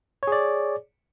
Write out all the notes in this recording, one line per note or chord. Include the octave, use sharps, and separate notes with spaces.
G#4 C#5 D5